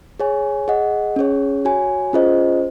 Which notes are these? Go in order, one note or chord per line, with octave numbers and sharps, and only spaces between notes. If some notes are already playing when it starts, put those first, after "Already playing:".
G#4 C#5 G#5
G#4 D#5 F#5
C#4 G#4 C#5
F#4 C#5 G#5
C#4 F4 G#4 C5 D#5